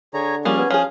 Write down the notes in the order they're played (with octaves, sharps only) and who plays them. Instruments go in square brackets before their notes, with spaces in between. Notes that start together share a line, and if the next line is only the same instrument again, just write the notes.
[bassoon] D3 [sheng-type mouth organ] G#4 C#5 A#5
[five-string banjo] F3 G3 A#3 [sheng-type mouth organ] C#4 G#4
[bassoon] B3
[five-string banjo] F3 G#4 [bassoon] C#4 [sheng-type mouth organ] F5